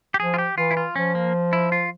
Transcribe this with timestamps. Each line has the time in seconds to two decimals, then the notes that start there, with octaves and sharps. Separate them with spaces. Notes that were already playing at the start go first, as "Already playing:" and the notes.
0.14 G4
0.19 F3 G#4
0.34 F4
0.38 G4
0.58 E3 F4
0.71 E4
0.77 F4
0.96 F3 C#4
1.15 A#3
1.53 E4
1.72 F4